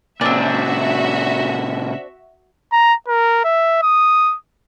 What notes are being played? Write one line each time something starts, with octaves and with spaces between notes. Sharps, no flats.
A#2 C#3 C4 D4 F#4 E5
A#5
A#4
E5
D#6